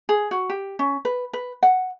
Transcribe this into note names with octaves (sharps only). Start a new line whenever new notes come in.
G#4
F#4
G4
C#4
B4
B4
F#5